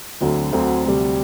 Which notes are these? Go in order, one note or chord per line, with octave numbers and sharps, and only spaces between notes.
D2 D3 F#3 C4
D2 D3 F#3 C4
D2 C3 G3